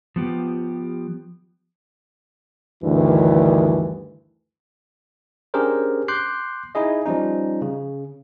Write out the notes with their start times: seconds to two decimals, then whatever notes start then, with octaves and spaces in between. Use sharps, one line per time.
0.16 F3 B3 G4
2.84 D2 G2 D#3 E3
5.54 C#4 D4 G4 G#4 A#4 C5
6.08 C6 D6 F#6 G6 C7
6.75 D#4 E4 G#4 D#5
7.06 F3 G3 C#4 D#4
7.62 C#3